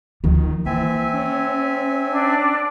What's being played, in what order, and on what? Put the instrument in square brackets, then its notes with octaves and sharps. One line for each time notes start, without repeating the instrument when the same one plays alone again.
[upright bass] D2 F3 [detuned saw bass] D#3
[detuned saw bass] E3 [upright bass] A#3 [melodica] C4 E5 G#5
[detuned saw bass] C#4
[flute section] D4